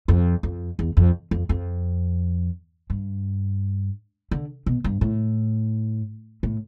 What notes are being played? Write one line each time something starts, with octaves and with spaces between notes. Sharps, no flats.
F2
F2
E2
F2
F2
F2
G2
D3
B2
G2
A2
A2